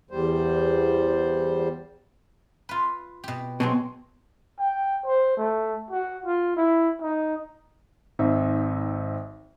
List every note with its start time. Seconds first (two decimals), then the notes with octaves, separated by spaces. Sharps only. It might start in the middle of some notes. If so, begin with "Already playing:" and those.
0.11 E2 G3 C5
2.69 F4 B4
3.24 B2 G4
3.60 B2 F#3 G#3 C4
4.59 G5
5.05 C5
5.37 A3
5.90 F#4
6.26 F4
6.56 E4
7.02 D#4
8.19 G#1 C4 D#4 E5